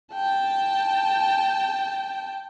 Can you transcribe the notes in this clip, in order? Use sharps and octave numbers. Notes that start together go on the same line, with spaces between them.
G5 A5